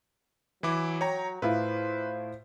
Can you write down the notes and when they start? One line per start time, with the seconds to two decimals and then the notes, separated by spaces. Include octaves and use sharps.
0.63 E3 F#3 E4 D6
1.01 C#5 G5 A#5
1.42 A2 E4 F4 B4 C5